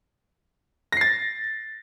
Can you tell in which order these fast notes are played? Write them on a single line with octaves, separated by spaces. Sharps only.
A#6 C7 A6